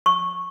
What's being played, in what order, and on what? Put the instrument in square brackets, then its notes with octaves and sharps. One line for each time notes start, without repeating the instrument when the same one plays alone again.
[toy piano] C#6